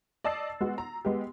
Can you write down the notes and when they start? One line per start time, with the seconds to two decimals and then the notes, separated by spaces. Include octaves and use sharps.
0.24 D5 D#5 A5 E6 A6 C7
0.60 G#3 B3 F#4
0.78 A#5
1.05 G#3 B3 G4